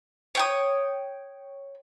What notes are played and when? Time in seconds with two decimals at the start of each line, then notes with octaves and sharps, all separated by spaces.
0.35 C#5 G5 D#6